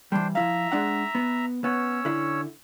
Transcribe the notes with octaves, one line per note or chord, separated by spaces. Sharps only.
E3 G3 D4 C5 G5
F3 E4 E5 F5 A#5
G#3 D4 F#5
B3
B3 C#4 C#5 E6
D3 E4